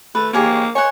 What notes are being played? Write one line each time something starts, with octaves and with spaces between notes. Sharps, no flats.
A3 B4
A#3 G4 G#4 C#5
C#5 F#5 G#5